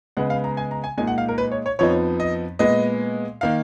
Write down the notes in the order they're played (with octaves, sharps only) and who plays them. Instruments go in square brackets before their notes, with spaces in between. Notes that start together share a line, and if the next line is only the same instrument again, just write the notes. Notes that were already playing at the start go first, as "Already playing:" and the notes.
[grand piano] C#3 G#3 B3 F#5
F5
A#5
G#5
A#5
G#5
A#2 G#3 D#4 G#5
F#5
F5
A#4
B4
C#5
C#5
F2 F3 B3 D#4 C#5
D#5
A#2 G#3 B3 D#5
D#3 A#3 F5